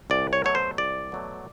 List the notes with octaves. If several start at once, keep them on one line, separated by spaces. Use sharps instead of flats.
C2 D5
C#5
B2 F#3 A3 C#5
C5
C2 D5
B2 F#3 A3